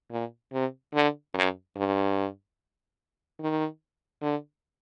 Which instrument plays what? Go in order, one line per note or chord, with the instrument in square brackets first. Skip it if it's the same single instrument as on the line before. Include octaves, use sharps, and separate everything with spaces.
[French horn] A#2
C3
D3
F#2
G2
D#3
D3